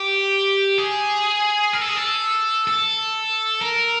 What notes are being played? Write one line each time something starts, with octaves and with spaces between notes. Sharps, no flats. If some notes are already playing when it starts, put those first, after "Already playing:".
Already playing: G4
G#4
A#4
A4
G#4
A4
A4
A#4